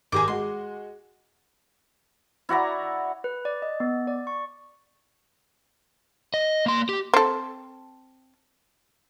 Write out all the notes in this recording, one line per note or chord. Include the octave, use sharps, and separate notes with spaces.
G#1 G4 G#4 G#5 A#5 D6
G#3 F#4 C6
E4 F#4 D5 A#5
B4
D5
D#5
B3
D5
C#6
D#5
A#3 C6
G4
C4 A4